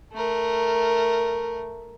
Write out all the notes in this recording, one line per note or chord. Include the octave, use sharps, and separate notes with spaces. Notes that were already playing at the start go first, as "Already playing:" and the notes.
A3 A#4